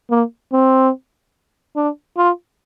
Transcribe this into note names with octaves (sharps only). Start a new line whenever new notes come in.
A#3
C4
D4
F4